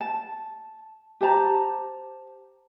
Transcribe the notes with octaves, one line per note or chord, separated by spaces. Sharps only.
A5
G4 C5 A5 A#5